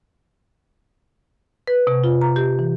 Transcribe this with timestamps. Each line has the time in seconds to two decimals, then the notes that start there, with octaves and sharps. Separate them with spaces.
1.67 B4
1.87 C3
2.04 F4
2.21 A#5
2.36 G4
2.59 E3